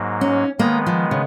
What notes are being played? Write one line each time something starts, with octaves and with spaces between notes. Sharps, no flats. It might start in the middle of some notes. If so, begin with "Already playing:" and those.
Already playing: G#2 F#3 A#3
C#4
D#3 G#3 A#3 B3
F3
C#3